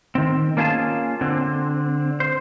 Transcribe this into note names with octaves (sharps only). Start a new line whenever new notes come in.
D#3 C4
A#3 C#4 F4 G#4 G#5 A5
D3 C4
C5